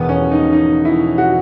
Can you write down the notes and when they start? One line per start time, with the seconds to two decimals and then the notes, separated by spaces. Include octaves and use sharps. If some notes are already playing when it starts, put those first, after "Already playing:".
Already playing: E1 E2 B2 B3
0.09 C#4
0.31 D#4
0.53 D#4
0.85 E4
1.18 F#4